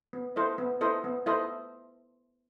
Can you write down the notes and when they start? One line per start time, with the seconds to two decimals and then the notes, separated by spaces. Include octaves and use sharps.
0.13 B3
0.36 E4 A4 C5 D#5
0.58 B3
0.81 E4 A4 C5 D#5
1.04 B3
1.26 E4 A4 C5 D#5